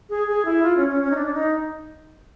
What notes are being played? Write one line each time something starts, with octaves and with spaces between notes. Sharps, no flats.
G#4
G#4
E4
F4
C#4
C#4
C#4
D#4
D4
D4
D#4